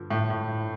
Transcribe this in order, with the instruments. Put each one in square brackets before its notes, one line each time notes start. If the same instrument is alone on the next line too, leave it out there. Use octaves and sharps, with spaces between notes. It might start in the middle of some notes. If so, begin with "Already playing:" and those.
Already playing: [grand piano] G2 D3 F3
[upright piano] A2
A2